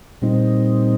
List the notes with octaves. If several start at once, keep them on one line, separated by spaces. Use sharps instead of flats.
A#2 G3 C4 D#4